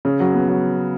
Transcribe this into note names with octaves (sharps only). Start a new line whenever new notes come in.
C#3
F#3
B3
F#3